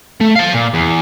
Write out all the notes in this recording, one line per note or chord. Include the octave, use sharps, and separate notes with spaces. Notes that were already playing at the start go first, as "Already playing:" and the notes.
A3
F5 A5
A#2
E2